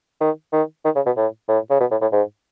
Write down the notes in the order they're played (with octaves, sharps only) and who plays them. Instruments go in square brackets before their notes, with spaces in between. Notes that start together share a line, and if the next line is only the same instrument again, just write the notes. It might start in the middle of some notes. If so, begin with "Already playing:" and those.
[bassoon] D#3
D#3
D#3
C#3
B2
A2
A2
C#3
B2
A2
A2
G#2